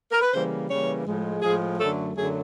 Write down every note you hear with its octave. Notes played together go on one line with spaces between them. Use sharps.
A#4
B4
C#3 E3 G3 A#3 C5
C#3 E3 G3 A#3 C#5
A2 F3 G#3
A2 F3 G#3 G#4
F#2 D3 F#3 A3 A4
F#2 D3 F#3 A3 G#4